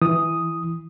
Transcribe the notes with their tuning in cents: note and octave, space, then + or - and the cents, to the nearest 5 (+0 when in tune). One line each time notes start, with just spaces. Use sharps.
E3 +0 D#6 +0